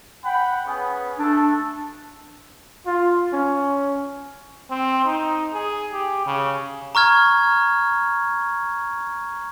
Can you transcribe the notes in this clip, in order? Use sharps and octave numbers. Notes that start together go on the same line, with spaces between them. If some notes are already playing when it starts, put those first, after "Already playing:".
F#5 G5 B5
B3 C#4 G#4
A3 D4 A4
F4
C#4
C4
D#4
G#4
G4
C#3
A#5 C#6 F6 G#6